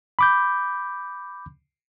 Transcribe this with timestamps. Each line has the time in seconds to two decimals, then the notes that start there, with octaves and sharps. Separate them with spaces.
0.19 B5 D6 G6